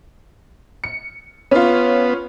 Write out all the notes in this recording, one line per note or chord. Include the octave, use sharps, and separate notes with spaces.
C#7
B3 C#4 F4